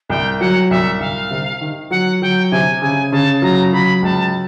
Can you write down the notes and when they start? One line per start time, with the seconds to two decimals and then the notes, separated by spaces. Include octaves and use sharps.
0.10 C2 G5
0.40 F#3 F#5
0.70 C2 E5
1.00 C2 F5
1.31 C3
1.61 D#3
1.91 F#3 F#5
2.22 F#3 G5
2.51 C3 G#5
2.82 C#3 G#5
3.12 C#3 A5
3.42 F#3 A#5
3.72 F#3 B5
4.02 C#2 A5